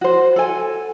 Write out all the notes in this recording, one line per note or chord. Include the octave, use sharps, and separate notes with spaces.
F#4 C5
A4 G#5